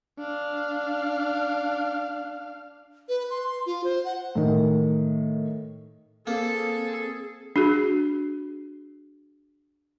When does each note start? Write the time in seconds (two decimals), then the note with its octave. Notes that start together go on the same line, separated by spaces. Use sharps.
0.19 D4 F5
3.09 B4
3.30 C6
3.46 C6
3.66 F4
3.84 C5
4.05 F#5
4.35 A2 D#3
6.27 A#3 C4 G#4 A4
7.56 D4 F#4 G#4